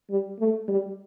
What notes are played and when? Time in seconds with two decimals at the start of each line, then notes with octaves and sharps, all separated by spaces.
0.10 G3
0.40 A3
0.68 G3